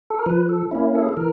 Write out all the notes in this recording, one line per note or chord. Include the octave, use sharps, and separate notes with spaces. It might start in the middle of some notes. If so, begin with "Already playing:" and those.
A4
A#4
F3 B4
A4
A#3 C#4 E4
A4
G#4
A4
E3 A#4